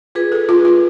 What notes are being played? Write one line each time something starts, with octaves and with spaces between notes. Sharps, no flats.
F4 G#4 B4
A4
F4
F4